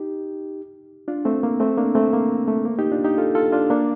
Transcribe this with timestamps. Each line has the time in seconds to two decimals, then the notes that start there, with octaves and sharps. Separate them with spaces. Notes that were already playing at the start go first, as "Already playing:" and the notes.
Already playing: D#4 G4
1.08 D4 F4
1.25 A3 C4
1.43 A#3
1.60 A3 C4
1.78 A#3 D4
1.95 A3 C4
2.13 A#3
2.48 A3
2.65 A#3
2.79 D#4 G4
2.92 D4 F4
3.04 D#4 G4
3.17 F4 A4
3.35 F4 A4
3.52 D4 F4
3.70 A#3 D4